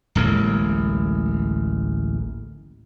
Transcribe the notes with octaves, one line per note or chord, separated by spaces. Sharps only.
D1 A1 G#3 A#3